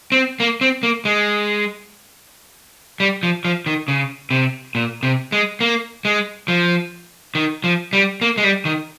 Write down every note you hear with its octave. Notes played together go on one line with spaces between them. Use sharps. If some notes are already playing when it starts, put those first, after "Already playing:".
C4
A#3
C4
A#3
G#3
G3
F3
F3
D#3
C#3
C3
A#2
C3
G#3
A#3
G#3
F3
D#3
F3
G3
A#3
G#3
G3
D#3